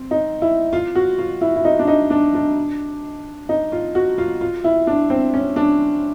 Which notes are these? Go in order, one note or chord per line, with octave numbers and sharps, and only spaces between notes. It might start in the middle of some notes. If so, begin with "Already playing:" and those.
Already playing: C4
D#4
E4
F4
F#4
F4
E4
E4
D#4
D4
D#4
D4
D4
D#4
F4
F#4
F4
F4
E4
D4
C4
C#4
D4